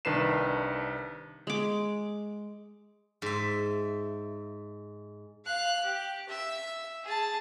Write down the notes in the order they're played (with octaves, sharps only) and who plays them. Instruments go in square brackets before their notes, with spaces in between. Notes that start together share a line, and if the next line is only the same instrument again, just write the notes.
[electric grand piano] C2 D#3 D4 B4 C7 E7
[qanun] G#3 D6
[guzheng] G#2 E5
[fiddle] F5 F#6
G4
E5
G#4 A5